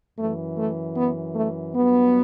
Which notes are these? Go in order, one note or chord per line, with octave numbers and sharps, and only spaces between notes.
F#2 E3 A3
A3
B3
A3
G2 F#3 B3